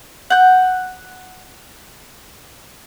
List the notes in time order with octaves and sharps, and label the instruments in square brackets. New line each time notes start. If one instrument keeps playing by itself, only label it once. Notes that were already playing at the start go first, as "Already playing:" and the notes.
[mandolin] F#5 G6